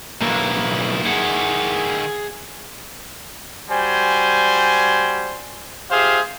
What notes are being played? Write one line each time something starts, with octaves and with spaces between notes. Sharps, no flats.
B1 D#3 A#3 E4
G#4 F#5
G3 F#4 C5 G#5
F4 G4 G#4 C5 E5 F5